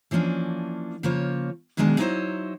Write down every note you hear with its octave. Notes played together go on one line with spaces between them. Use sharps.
E3 F3 A#3 C#4 D4
C#3 F3 A#3 F4 C5 C#5
B2 D#3 F#3 G#3 D4 G#4
F#3 D#4 E4 G#4 C5 C#5